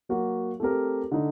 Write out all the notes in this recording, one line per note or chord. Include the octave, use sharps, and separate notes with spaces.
F#3 A#3 F#4
A3 C4 G4 A#4
D3 A3 D#4